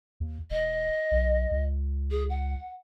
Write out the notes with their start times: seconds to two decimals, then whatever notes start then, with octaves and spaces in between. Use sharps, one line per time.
0.20 D#2
0.50 E1 D#5
1.11 B1
1.51 C#2
2.11 G#4
2.29 F#5